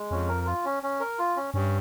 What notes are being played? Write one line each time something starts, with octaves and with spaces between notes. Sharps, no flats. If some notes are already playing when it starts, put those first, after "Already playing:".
Already playing: G#3
F2 C#4
A#4
F4
C#4
C#4
A#4
F4
C#4
G2 C#4